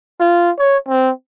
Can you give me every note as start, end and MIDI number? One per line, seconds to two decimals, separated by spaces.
0.20 0.51 65
0.58 0.77 73
0.89 1.11 60